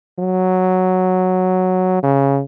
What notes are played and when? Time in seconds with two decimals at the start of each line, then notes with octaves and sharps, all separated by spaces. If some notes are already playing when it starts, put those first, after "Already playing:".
0.19 F#3
2.03 C#3